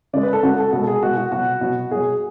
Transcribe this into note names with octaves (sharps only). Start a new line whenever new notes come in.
C#3 G#3 D5
B4
A4
C#3 G#3 F#4
A4
B2 G#3 A4
G#4
B2 G#3 F#4
F#4
B2 F#3 F#4
B2 F#3
B2 F#3 G#4